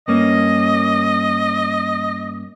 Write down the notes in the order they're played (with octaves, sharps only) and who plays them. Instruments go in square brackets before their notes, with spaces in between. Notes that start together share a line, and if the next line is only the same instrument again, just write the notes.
[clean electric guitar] G2 A#3 C#4 [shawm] D#5